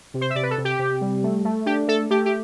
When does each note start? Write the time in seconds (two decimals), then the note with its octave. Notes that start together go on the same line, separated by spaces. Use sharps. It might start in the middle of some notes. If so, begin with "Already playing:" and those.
0.14 C3
0.21 C5
0.30 E5
0.35 C3 D5
0.43 B4
0.51 A4
0.58 C3
0.65 G4
0.79 C3
1.01 G3
1.23 A3
1.45 A3
1.66 D4 G4
1.88 A3 A4
2.10 A3 G4
2.26 G4